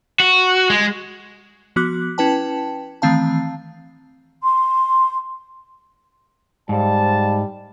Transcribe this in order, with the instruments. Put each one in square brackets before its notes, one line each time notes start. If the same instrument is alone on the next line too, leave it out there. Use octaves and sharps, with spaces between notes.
[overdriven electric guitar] F#4
G#3
[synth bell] F3 B3 F#4 D6 F#6
C#4 E4 B4 G5 A5
D#3 E3 A3 C4 F5 A5
[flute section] C6
[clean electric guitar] G#2 [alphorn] G3 [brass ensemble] C5 F5 A5